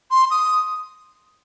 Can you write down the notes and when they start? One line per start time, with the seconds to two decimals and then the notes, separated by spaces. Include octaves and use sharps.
0.11 C6
0.31 D#6